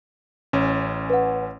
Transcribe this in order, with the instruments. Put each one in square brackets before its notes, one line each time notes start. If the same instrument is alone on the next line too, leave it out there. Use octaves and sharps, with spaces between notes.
[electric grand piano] A1 C#4
[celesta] B4 F#5